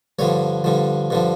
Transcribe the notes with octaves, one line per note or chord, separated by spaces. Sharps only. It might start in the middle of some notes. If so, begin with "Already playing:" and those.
G2 D3 F3 C#5
G2 D3 F3
G2 D3 F3